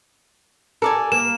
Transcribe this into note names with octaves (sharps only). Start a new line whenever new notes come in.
A4 A#4 D5 G#5
A#3 E7